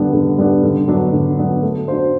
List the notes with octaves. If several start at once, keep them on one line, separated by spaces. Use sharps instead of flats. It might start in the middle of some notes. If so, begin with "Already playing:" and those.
Already playing: D3 G3 B3 D4
D3
G3 B3 D4
D3
F#3 B3 D4
D3
F#3 B3 D4
A3
D4 F#4 C5